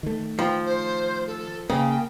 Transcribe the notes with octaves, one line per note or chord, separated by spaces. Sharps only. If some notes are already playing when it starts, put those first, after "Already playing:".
D#3 A3
F3 G5
C5
A4
C#3 A#3 G5